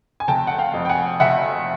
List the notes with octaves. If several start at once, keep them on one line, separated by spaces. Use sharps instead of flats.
G#5
F1 G5 A5
F#5
F5 G5
F2
G5
F#5 G#5
F1 E5 F#5